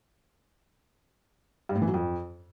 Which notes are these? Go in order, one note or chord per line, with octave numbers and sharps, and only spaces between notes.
G2
A2
E3
F#3
F2